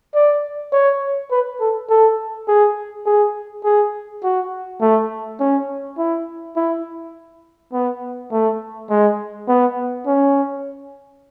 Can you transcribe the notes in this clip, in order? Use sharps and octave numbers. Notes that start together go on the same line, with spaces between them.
D5
C#5
B4
A4
A4
G#4
G#4
G#4
F#4
A3
C#4
E4
E4
B3
A3
G#3
B3
C#4